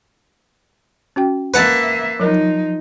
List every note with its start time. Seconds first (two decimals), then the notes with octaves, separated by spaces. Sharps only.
1.16 C#4 F#4 G5
1.54 A#3 B4 E5 F#5 A5
2.20 F3 F#3 D#4 A#4